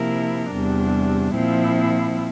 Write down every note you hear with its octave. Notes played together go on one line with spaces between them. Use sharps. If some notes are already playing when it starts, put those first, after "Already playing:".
Already playing: C3 F3 A#3 E4 A#4
E2 C3 G3 D4
A#2 F3 C4 E4